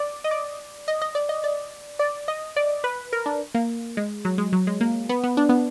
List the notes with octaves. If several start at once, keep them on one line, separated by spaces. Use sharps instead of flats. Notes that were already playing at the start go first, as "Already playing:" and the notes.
Already playing: D5
D#5
D5
D#5
D#5
D5
D#5
D5
D5
D#5
D5
B4
A#4
D4
A#3
G#3
F#3
G#3
F#3
G#3
A#3
B3
B3
D4
B3